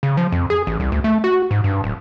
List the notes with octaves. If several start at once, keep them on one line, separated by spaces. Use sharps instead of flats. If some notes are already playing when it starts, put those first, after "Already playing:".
C#3
F3
F2
G#4
A1
C2
D2
A3
F#4
G#2
G2
D1